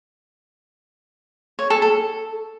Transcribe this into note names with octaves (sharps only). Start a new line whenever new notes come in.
C#5
A4
A4